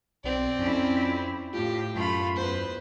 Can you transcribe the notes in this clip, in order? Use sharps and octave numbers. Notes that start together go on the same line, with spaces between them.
B1 C4 D5
F2 C#4 E4
A2 F4 G4
F#2 A3 F4 B5
E2 B4 C5